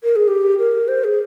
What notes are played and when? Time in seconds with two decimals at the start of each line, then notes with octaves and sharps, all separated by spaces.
0.04 A#4
0.16 G#4
0.28 G4
0.59 A#4
0.88 C5
1.04 G#4